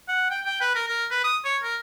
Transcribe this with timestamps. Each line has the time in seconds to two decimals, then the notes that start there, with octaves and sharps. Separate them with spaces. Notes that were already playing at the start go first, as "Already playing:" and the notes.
0.08 F#5
0.31 G5
0.45 G5
0.61 B4
0.75 A#4
0.88 A#4
1.11 B4
1.24 D#6
1.45 C#5
1.63 A#4